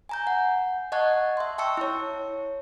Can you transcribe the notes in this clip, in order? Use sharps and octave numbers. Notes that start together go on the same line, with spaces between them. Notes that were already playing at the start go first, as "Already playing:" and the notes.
G#5 A#5 G6
F#5
D#5 F#5 A5 C#6 F#6 G#6
E5 C6
G5 A5 C#6 E6 C#7
E4 C#5